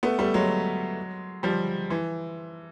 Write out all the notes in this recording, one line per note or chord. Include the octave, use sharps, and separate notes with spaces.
A3 B3
G3 A3
F#3 G#3
F3 G3
E3